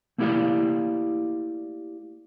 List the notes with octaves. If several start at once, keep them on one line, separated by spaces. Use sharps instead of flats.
A3 A#3 E4 G4 D5 F5